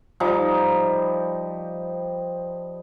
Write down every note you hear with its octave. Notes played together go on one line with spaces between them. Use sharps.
F3 G3 D#4